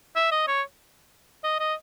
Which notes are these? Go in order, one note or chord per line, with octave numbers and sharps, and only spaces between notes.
E5
D#5
C#5
D#5
D#5